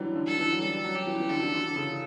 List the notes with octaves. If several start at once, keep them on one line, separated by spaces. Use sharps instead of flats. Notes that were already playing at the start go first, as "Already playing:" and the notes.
Already playing: D3 E3 F#3 G3
D3
A4
E3
F#3
G3 A4
F#3
G4
E3
E3
D3 A4
E3
D3
C#3